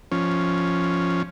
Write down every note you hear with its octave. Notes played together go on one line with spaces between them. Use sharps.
F3 C#4